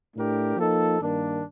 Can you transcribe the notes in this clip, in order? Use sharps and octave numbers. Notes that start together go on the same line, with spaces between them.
A2 A3 D4 G4 A#4
F3 A#3 D#4 A4
G2 D#3 A#3 D4